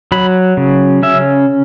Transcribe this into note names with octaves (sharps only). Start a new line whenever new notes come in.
F#3 B5
C#3
C#4 E5